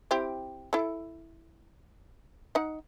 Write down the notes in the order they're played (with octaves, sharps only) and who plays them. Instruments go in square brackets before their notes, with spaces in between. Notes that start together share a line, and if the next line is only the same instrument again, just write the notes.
[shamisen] C4 E4 G4
E4 A4
D#4 F#5